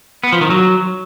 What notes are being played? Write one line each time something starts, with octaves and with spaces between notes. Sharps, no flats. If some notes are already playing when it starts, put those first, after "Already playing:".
B3
F3
D#3
F#3